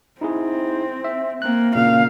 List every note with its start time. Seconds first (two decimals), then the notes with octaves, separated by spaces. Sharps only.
0.21 C4 D#4 E4 G#4
1.04 E5
1.42 A#3 C4 F#6
1.75 A#2 C#3 A#3 F5